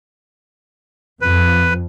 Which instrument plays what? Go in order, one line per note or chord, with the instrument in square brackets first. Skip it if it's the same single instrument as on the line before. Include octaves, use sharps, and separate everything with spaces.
[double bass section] F2 [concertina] B4